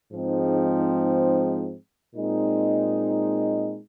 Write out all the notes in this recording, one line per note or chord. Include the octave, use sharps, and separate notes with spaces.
G#2 F3 G#3 C4 D#4
A#2 G#3 C4 D#4